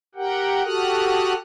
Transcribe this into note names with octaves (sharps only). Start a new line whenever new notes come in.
G4 A#4 F#5 G5
F#4 G4 A4 D#6 F6 F#6